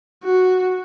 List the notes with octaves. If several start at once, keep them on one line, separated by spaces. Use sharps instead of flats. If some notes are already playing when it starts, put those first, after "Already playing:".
F#4